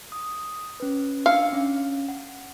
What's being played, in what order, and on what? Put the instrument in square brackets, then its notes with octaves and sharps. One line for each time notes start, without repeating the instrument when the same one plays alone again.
[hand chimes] D#6
C#4 B4
[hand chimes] D4 E6 C#7 [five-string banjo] F5
[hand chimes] C#4
F#5